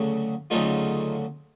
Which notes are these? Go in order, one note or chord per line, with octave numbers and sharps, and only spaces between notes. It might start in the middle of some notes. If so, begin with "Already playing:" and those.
Already playing: D2 C#3 F#3 A3
D2 C#3 F#3 A3 D#4 F4